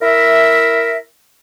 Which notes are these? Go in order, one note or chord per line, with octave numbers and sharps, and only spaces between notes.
E4 A#4 E5